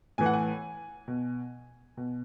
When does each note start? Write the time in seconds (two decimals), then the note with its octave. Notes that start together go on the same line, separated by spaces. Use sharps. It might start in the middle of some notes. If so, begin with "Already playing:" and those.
0.18 A2 E3 G#5
0.26 F#5
0.34 G#5
1.08 B2
1.97 B2